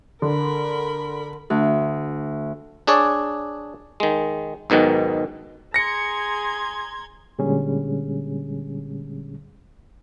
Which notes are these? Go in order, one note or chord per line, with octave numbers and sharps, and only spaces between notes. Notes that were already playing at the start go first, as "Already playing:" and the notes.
D3 A#4 B5
D2
D4 G#4 C#5 D5
D#3 G#3
B1 G#2 B2 D#3
G#4 A#5 C6 G#6 A#6 C#7
A#2 D3 G3 G#3 C#4 G#4